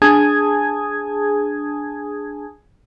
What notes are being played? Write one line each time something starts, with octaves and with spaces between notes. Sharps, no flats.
D4 G#4 G#5 A5 D#6 G#6